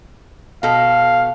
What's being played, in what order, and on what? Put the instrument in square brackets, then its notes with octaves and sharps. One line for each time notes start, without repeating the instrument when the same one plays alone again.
[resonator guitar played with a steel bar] B2 A4 [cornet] F5